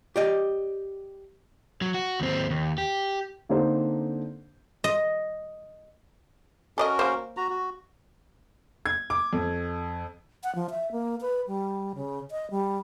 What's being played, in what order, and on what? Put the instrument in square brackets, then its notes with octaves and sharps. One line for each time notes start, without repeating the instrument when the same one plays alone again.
[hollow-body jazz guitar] G4 D5 D#5
[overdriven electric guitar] F#3
F#4
D#2 C4
D#2
G4
[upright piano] D3 A#3 C4 D4 D#4 C5
[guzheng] D#5
[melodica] C#4 F#4 A#4 [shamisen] A4 D5 D#5
[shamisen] A#3 C5
[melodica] F#4 A#5
F#4
[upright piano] G#6
D6
F2
[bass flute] F#5
F3
E5
A#3
B4
G3
C#3
D#5
G3